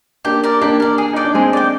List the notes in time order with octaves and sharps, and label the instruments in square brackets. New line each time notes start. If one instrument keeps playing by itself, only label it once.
[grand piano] A#3 D4 [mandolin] G4
[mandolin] A#4 D5
[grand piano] A#3 D4 [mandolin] G4
[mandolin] A#4 D5
G#4
[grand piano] D#4 [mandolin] D5 G5
[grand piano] D4
[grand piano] G#3 C4 [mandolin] G#4
[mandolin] D5 G5